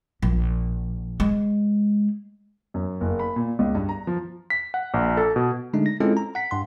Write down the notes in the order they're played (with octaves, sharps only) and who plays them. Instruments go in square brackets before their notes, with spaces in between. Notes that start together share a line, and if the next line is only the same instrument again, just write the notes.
[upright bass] A#1
G#3
[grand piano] F#2
F#1
B5
A#2
C#2
G2
A#5
F3
[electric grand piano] B6
F#5
A#1
A4
B2
[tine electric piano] D3 G#3 A3 D4 D#4
A#6
G#3 C4 C#4 E4 F4 A4
A#5
F#5 B6
G2 C6